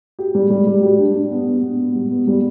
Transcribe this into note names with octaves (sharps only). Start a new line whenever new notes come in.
G4
G3
G3
G3
G4
D4
D4
B3
B3
B3
B3
G3
B3
G3